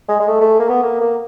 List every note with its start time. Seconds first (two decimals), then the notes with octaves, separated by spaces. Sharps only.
0.09 G#3
0.20 G#3
0.28 A3
0.41 A3
0.59 A#3
0.69 B3
0.83 A#3
1.01 A#3